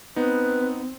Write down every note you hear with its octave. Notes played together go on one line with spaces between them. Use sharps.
B3 C4 D#4 B4